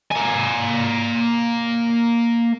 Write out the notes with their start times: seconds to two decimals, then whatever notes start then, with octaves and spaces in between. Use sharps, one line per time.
0.12 A#3 G#5